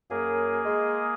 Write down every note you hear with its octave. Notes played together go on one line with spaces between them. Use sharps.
F#2 A#3 G#4
G#3 D#5